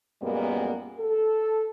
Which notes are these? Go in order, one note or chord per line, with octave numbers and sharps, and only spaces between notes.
F#2 A#2 G3 G#3 A#3 B3
A4